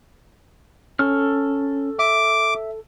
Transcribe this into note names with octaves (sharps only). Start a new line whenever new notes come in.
C#4 A4 C#6 F6
E5 D6